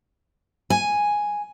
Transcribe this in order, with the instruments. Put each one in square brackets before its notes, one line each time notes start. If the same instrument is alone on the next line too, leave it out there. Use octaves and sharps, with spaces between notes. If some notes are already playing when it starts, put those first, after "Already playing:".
[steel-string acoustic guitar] G#5